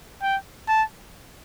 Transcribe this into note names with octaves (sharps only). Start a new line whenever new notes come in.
G5
A5